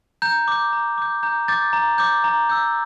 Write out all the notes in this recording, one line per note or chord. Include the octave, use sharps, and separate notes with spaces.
A#5 G6
D6 G6
A#5
D6 G6
A#5 G6
D6 G6 A6
A#5
D6 G6
A#5
E6 G6